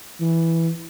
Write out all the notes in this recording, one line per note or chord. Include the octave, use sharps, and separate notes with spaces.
E3